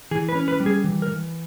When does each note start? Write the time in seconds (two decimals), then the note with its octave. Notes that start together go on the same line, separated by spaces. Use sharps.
0.11 E3 G#4
0.29 B4
0.35 C#4
0.48 B4
0.60 G3
0.66 G#4
0.84 E3
1.02 A#4
1.08 E3